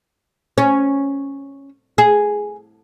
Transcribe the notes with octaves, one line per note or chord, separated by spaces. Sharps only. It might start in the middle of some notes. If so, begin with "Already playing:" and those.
C#4
G#4